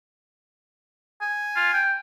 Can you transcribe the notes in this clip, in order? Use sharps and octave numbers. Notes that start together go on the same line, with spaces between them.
G#5
F4
G5